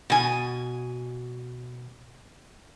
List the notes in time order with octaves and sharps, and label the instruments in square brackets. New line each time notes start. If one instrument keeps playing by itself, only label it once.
[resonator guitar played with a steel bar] B2 G#5